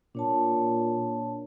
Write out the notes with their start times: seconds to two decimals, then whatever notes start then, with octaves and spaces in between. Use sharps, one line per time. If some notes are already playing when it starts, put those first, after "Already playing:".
0.15 A#2 D4 C#5 A5